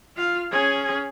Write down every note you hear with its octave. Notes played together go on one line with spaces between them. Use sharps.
F4 F5
C#4 G#4